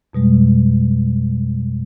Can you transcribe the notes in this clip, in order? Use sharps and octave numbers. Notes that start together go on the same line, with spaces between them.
F2 B2 G3 G#3